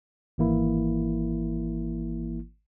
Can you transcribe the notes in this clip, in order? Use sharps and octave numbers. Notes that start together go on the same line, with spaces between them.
G#1 E3 A#3 E4